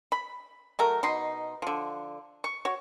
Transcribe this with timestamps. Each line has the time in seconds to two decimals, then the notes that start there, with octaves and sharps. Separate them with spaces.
0.12 B5
0.79 F#3 A3 A#4
1.03 B2 D#4 C6
1.62 D3 F3
2.44 C#6
2.65 F#4 C#5